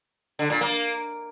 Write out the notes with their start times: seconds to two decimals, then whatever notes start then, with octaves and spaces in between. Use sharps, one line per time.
0.39 D3
0.50 A#2
0.61 A#3